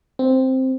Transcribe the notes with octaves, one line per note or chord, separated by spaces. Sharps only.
C4